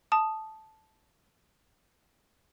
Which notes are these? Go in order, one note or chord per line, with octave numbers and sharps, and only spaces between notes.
A5 D#6